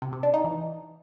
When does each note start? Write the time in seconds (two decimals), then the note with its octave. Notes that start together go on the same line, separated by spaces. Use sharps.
0.02 C3
0.13 C3
0.23 D4
0.34 D#4
0.44 E3